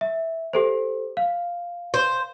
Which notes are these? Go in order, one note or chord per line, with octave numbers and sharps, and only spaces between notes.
E5
G4 A4 C5
F5
C5